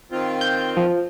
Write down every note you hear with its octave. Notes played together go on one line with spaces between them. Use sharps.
D#3 C4 F4
G6
F3